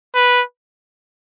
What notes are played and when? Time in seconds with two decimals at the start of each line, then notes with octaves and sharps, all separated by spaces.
0.15 B4